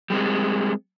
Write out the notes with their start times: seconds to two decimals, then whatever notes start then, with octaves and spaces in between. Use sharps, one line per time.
0.10 G3 G#3 C4